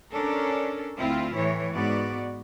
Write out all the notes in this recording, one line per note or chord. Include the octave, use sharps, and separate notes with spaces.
C#4 D4 A4 A#4
D2 C4 E4 F4
A2 E3 C#5
G#2 B3 F#4 D5